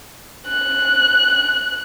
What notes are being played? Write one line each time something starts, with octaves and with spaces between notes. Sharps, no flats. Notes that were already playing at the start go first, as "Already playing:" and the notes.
F#6